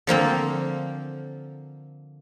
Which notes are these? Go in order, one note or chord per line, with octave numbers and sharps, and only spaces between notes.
D3 F3 A#3 C4